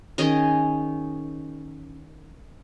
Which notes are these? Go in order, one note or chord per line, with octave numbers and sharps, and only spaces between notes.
D#3 C#4 G#4 D#5